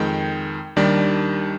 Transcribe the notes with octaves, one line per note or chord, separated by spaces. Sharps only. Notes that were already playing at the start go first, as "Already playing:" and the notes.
Already playing: F2 D#3 G#3 G5
D#2 D#3 G3 D4 D5